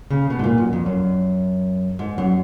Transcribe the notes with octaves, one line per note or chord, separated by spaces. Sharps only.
C#3
B2
G#2
A#2
F#2
F2
F#2
G#2
F#2